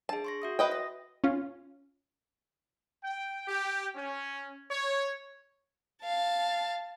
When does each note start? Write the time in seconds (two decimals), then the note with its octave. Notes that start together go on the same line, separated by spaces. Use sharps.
0.09 D4 G#4 A5
0.24 C6 C#6 A#6
0.42 F#4 E5 D#6
0.59 B4 D#5 G5
0.71 D#6 A#6
1.24 C#4 F4
3.03 G5
3.48 G4
3.95 C#4
4.69 C#5
6.03 F5 A5